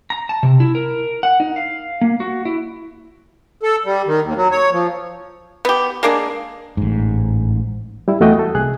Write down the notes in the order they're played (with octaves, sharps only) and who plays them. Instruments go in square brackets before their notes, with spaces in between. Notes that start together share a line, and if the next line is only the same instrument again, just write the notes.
[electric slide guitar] A#5
A5
C3
E4
A#4
F#5
D#4
F5
A#3
F#4
E4
[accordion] A4
G3
D#3
D#2
F#3
C#5
F3
[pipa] B3 G4
G#3 A#3 D4 G#4
[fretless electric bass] A1 G#2
[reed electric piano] G3 E4
E2 A3 F#4 D#5 G5
A4
C2 G#4 F#6